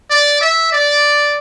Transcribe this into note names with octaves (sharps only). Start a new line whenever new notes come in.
D5
E5
D5